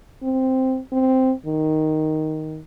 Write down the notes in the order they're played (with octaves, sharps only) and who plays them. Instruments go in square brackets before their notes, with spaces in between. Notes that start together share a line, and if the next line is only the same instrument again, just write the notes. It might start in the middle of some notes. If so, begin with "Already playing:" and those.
[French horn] C4
C4
D#3